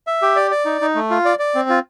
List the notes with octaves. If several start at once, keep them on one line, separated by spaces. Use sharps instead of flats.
E5
G4
D5
D5
D#4
D#4
A3
F4
D5
D5
C4
F4